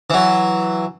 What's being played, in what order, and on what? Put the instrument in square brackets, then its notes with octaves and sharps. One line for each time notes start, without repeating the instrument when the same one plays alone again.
[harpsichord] E3 F#3